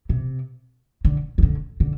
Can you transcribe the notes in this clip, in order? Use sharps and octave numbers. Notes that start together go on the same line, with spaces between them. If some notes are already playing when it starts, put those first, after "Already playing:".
C3
D3
D#3
D3
D3